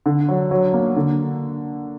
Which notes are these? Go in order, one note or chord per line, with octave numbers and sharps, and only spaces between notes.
D3
F#3
F#3
A#3
D3